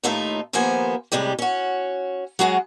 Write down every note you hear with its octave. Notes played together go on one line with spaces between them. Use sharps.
D#2 A2 A3 D#4 F4 E5
D#2 F3 A#3 B3 C5 G#5
A2 C3 G3 G#3 G4
C#4 F#4
F#3 G#3 C#4 F#4 G#4